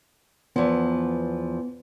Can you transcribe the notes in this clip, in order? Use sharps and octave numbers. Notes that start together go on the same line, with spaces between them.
E2 F3 B3